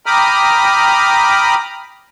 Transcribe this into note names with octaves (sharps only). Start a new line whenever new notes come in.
G5 A#5 B5 D6 D#6 F6